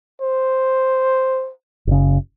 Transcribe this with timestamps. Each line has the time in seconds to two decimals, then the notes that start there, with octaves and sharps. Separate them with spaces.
0.21 C5
1.87 F#1 C#3